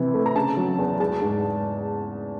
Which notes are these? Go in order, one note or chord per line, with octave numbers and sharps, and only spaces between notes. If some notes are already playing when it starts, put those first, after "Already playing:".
Already playing: C3 E3
A3
A#5
C#3 A5
F#3
E2
G#3 A5
G#2